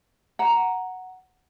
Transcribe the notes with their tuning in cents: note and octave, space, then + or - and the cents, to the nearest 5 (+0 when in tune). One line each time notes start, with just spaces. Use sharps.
F#5 +0 A#5 +0